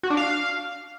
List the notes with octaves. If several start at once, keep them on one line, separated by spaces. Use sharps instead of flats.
F#4
D4
F5